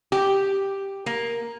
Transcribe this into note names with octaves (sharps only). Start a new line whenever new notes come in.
G4
A#3